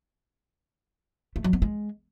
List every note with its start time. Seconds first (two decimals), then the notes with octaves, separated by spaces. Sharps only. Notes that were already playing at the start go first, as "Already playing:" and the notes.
1.36 A3
1.44 F#3
1.53 B3
1.62 G#3